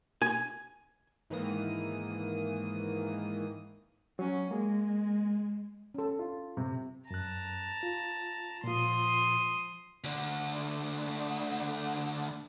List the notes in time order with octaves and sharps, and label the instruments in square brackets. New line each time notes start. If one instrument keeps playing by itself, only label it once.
[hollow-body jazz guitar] G#5
[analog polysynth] G#2 D#3 E3 A#3 D#6
[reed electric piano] F#3 [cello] C#4
[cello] G#3 [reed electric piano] A#3 G#4
[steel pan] C#4 A4
[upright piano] F4
C3
[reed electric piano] F#2 F#6 [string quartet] A5 A#5
[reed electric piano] F4
[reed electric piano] A#2 F4 [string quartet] F3 C6 D#6
[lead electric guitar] D2 D3